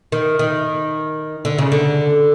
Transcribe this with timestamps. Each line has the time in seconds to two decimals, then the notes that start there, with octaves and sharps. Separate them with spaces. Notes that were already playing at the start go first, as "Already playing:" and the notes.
0.12 D#3
0.39 D#3
1.45 D3
1.58 C#3
1.72 D3